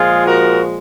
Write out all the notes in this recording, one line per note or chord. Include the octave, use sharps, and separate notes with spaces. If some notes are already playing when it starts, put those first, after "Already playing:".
Already playing: A#2 F3 G#3 F4 G#4
F#4 A#4